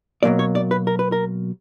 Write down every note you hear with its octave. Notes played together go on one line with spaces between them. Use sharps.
B2 F#3 A#3 D5
C#5
D5
B4
A#4
B4
A#4